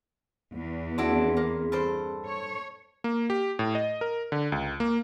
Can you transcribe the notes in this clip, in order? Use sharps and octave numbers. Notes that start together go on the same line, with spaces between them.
E2
C4 D4 E4 F#4 G#4
A#3
G2 A4 C5
C#5
A#3
G4
A2
D#5
A#4
D3
C#2
A#3